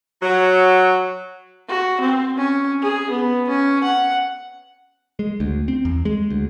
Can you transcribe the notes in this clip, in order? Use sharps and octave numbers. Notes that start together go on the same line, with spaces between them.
F#3
F#4
C4
C#4
G#4
B3
C#4
F#5
G#3
D2
C4
E2
G#3
D2